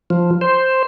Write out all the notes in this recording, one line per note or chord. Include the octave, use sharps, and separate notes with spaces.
F3
C5